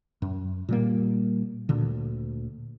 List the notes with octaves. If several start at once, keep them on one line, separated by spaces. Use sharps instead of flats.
F#2
A#2 G3 A#3
D2 A#2 D3